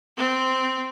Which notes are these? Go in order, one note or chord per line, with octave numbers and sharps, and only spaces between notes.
C4